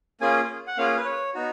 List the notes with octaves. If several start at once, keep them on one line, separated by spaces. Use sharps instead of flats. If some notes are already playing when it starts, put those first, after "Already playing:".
A#3 C#4 F4 G#4 G#5
F#5
A#3 C#4 F4 G#4 F5
B4
C#5
B3 D#4 F#4